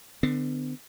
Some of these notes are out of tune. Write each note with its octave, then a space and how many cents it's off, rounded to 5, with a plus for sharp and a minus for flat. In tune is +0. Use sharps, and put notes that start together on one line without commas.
D3 +30 B3 +45